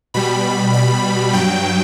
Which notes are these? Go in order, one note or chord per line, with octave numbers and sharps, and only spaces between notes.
B2 G3 B5
B5
G2 F#3 G5